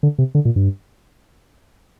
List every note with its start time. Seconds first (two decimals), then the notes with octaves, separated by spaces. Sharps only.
0.03 D3
0.18 C3
0.35 D3
0.45 A#2
0.56 G2